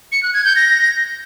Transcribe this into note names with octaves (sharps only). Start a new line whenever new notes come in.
C#7
F#6
G#6
G6
A#6